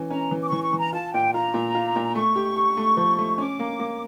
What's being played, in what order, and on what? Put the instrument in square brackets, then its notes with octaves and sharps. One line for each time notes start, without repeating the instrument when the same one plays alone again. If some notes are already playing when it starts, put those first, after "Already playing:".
Already playing: [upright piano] E3 C#4
[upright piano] C#4 [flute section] A#5
[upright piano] E3
[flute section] D6
[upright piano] E3 [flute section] C#6
[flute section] C#6
[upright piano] E3 [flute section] A#5
[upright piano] F4 [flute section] A5
[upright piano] A#2 [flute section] G5
[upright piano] F4 [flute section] A#5
[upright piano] A#2
F4
A#2
[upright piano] A3 [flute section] C#6
[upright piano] G4
G4
A3
F3
A3
[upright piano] C#4 [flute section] D6
[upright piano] A#3
A#3